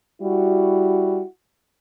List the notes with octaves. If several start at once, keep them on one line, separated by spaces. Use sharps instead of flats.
G3 E4 F#4